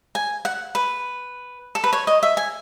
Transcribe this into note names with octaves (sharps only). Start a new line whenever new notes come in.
G#5
F#5
B4
A4
B4
C#5
D#5
E5
G#5